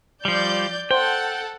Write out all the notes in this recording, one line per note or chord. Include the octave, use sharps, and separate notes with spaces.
F3 G3 D5 G6
A4 C5 F#5 G5